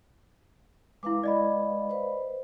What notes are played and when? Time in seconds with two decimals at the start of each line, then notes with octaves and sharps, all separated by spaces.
1.03 G#3 E4 B4 F5 D6
1.24 D5 D#5 B5
1.90 B4 C5